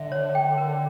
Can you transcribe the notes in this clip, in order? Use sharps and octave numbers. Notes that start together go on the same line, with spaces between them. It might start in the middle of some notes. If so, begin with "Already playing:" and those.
Already playing: D3 E5
C#5
G5
A#4